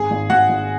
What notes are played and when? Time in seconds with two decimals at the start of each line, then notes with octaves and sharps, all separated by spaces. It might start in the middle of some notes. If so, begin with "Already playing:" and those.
Already playing: G#1 G#4 G#5
0.11 G#1
0.30 G#1 F#4 F#5
0.49 G#1